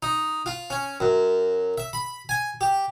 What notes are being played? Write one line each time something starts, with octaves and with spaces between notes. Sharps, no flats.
D#4
F4
C#4
F#2
E5
B5
G#5
G4